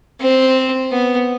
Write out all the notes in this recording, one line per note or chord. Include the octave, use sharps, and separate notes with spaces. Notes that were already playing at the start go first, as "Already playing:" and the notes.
C4
B3